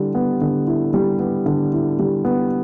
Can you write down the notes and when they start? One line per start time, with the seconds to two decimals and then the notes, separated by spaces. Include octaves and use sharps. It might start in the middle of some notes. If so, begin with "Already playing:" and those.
Already playing: D3 G3 E4
0.15 B3
0.41 D3
0.67 E4
0.94 G3
1.20 B3
1.46 D3
1.73 E4
1.99 G3
2.25 B3